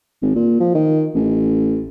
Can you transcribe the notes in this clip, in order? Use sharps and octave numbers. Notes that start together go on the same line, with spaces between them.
G#1
A#2
F3
D#3
A1